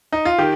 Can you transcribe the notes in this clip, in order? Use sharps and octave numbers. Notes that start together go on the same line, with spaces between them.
D#4
F4
D#3 G4